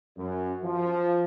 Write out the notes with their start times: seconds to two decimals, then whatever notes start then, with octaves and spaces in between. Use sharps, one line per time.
0.17 F#2
0.64 F3